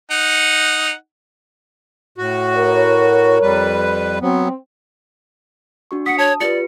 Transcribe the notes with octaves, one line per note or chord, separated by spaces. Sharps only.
D#4 F#5
A2 F#4
A#4 C#5
F2 G3 B4
F#3 B3 C4
D4 F#4 C#6
F#5 D#6 B6 C#7
C#5 A5
F4 G4 B4 D5 C#7